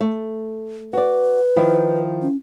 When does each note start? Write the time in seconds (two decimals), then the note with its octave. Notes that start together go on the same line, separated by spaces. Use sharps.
0.01 A3
0.93 F#4 B4 D5
1.56 D#3 F3 E4
2.22 C#4